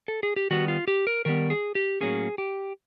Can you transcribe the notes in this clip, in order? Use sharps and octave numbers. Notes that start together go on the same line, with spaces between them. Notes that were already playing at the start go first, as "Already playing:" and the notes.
A4
G#4
G4
D#3 G3 B3 F#4
F4
G4
A#4
D#3 G3 B3 A#4
G#4
G4
A2 F#3 A#3 C#4 G#4
G4